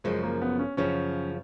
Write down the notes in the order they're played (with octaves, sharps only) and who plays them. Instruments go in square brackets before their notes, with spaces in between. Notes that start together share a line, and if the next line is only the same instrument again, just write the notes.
[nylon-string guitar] F#2 C#3 F3 [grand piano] G#3
[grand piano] A#3
B3
C#4
[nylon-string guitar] F#2 C#3 F3 [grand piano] C#4